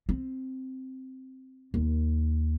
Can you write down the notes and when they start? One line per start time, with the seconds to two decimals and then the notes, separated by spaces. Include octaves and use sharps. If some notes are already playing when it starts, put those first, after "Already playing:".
0.09 C4
1.74 D#2 D#3